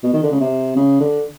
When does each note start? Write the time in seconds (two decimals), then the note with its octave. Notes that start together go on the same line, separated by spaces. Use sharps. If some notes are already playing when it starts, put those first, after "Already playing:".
0.03 B2
0.13 D#3
0.23 D3
0.31 C#3
0.40 C3
0.76 C#3
1.00 D3